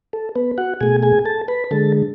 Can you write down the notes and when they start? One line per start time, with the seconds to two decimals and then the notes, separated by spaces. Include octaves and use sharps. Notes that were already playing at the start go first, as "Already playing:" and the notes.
0.13 A4
0.35 B3 B4
0.58 F#4 F#5
0.81 B2 A3 G#4 G#5
1.03 G#4 G#5
1.25 A4 A5
1.48 B4 B5
1.71 D3 G#3 A4 A5